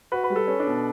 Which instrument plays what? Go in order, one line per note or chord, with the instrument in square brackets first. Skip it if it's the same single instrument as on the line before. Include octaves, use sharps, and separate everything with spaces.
[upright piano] F#4 [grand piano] B4
[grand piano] B4
[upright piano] G3
[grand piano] A4
[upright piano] C#4
[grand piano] D4
[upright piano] B2